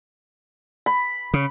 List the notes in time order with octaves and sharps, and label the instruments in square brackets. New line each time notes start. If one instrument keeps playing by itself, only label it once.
[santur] B5
[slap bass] C#3